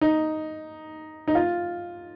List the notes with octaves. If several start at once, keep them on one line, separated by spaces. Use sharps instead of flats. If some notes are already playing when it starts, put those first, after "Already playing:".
D#4
D#4
F4